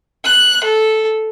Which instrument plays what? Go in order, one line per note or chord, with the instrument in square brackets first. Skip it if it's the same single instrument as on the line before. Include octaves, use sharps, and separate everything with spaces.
[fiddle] F#6
A4